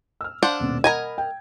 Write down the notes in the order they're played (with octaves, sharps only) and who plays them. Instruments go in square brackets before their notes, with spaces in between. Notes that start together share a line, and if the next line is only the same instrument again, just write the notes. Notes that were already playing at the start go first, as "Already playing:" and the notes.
[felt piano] E6 F6
[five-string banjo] D4 C5 F#5 [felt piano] F5
[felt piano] D#1 B2
[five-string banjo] A#4 D#5 G#5 [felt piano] F#5 B5 G#6
[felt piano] G5